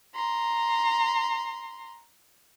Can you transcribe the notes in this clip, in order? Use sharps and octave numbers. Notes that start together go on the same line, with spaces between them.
A#5 C6